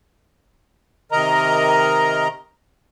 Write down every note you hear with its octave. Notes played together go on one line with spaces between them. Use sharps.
C3 D#3 A#4 D#5 A#5